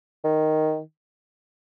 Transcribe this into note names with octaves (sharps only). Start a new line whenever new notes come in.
D#3